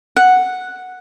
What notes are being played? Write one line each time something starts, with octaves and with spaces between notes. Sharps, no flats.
F#5